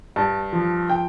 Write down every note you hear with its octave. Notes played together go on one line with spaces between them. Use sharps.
G2 A5
F3
G5